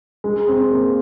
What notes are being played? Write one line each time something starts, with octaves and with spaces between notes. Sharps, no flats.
G#3
C4
A#3